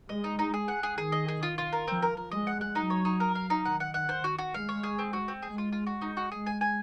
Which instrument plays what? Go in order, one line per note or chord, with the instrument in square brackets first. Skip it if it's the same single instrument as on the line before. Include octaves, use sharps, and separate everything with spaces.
[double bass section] G#3 [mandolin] D#5
[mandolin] D#4
D#4
G#4
F#5
G#4
[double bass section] D#3 [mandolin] G#4
[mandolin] D#5
G#4
F4
F4
A#4
[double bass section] F3 [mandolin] C4
[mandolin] A#4
A#4
[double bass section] G#3 [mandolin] D#5
[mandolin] F#5
F#5
[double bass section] F#3 [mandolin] D#4
[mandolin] C#5
D#4
A#4
F5
D#4
[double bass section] D#3 [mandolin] F#5
[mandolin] F#5
F#5
C5
F#4
F#4
[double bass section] G#3 [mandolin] F5
[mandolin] C#5
G#4
C4
F#4
C4
[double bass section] G#3 [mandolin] G#4
[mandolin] F4
F4
F#4
D#4
F#4
[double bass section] G#3 [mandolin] G#4
[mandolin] G#5
G#5